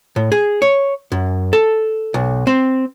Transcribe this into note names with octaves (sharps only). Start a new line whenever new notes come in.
A2
G#4
C#5
F#2
A4
B1
C4